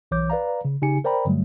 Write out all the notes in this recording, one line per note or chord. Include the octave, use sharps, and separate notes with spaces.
B1 E3 C#5 D6 G6
B4 D5 F5 A#5
C#3
C#3 D#4 G4 G#5 C#7
A#4 C5 D5 G5 A#5 B5
G2 D3 F#3 G3 A3